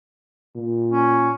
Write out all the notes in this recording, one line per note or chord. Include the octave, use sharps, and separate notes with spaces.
A#2
C#4